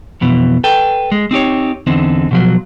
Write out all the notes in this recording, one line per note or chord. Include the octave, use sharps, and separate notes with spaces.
F2 B2 E3
A4 B4 G5
G#3
C4 D#4 G4 C#5
E2 D3 C4 D#4
B2 F3 F#3